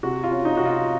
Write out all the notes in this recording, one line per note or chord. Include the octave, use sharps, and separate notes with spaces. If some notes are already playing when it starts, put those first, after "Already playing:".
C3 F#4
F4
C#4
D#4
C3 F#4
F4